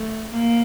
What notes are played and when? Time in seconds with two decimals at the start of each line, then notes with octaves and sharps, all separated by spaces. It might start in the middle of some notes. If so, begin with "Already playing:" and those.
Already playing: A3
0.33 A#3